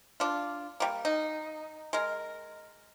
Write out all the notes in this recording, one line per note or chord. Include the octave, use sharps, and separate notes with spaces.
D4 F4
G3 A#3
D#4
G#3 A#4